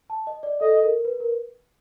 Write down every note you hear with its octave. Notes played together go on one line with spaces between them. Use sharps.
A5
D#5
D5
A4 D#5
A#4
B4
A#4